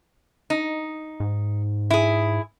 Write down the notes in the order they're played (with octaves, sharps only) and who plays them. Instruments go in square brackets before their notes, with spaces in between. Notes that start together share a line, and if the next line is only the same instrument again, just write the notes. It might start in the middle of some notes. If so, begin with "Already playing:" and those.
[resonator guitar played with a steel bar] D#4
[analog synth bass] G#2
[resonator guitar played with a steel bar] E4 G#4